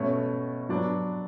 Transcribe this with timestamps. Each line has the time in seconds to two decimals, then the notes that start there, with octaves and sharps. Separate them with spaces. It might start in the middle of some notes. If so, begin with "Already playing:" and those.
Already playing: B2 A3 C#4
0.69 F#3 B3 D4